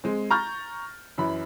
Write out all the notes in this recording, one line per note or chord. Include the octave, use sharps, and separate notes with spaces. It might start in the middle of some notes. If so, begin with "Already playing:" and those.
G#3 C4
A#5 C#6 F6 G6 A6
F#2 E3 B5